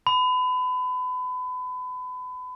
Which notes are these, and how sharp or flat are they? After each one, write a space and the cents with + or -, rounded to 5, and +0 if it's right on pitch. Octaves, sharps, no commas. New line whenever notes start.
B5 +30